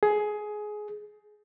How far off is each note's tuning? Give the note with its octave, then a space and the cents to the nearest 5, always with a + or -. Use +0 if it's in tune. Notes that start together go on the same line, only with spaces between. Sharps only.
G#4 +15